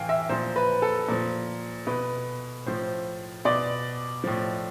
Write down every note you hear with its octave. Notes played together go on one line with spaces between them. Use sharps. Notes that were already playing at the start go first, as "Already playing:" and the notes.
Already playing: A2 E3 F5 G5 G#5
E5
A#2 F3 C5
B4
A4
A#2 F3
B2 B4
A2 F3 C5
B2 D5
A2 F3